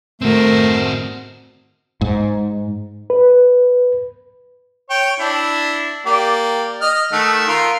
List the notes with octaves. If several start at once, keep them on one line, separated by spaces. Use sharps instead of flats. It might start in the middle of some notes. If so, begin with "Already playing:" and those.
A3 C4 F#4 A#4 C5
G#2
B4
C#5 G5
D4 E4
A#3 G4 D5
D#5 F6
D#3 A3 F#5
F4 A#4 C6